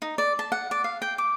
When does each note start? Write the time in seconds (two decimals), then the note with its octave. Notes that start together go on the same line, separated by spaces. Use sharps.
0.02 D#4
0.18 D5
0.39 A5
0.52 F#5
0.71 D5
0.84 F5
1.02 G5
1.18 D6